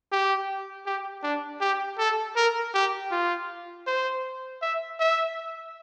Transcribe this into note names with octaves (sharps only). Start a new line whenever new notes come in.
G4
G4
D4
G4
A4
A#4
G4
F4
C5
E5
E5